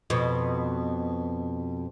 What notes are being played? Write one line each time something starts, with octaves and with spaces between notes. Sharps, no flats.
F2 B2